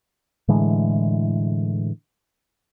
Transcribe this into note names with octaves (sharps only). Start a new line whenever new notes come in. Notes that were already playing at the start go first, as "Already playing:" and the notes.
A2 D3 E3 G#3